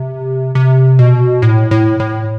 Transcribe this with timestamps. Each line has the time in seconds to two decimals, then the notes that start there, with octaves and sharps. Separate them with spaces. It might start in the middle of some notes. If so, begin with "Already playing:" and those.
Already playing: C3
0.55 C3
0.99 B2
1.42 A2
1.71 A2
2.00 A2